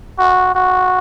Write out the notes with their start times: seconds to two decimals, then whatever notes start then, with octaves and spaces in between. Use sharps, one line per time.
0.19 F#4
0.55 F#4